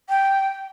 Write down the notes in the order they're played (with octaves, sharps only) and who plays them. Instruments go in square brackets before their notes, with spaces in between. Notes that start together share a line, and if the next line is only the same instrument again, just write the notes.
[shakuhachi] G5